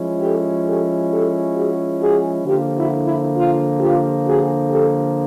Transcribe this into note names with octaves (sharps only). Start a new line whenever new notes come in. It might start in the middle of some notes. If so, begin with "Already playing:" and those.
Already playing: F3 G#3 C#4 E4
G4 A4
G4 A4
G4 A4
F#4 G#4
F#4 G#4
D3 F3 A#3 F4 G4
E4 F#4
E4
F4
F4 G4
F#4 G#4
G4 A4